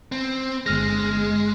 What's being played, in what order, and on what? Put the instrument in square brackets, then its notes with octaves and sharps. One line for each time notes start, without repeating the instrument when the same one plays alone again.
[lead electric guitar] C4
[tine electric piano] G1 F6 A#6 [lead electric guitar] G#3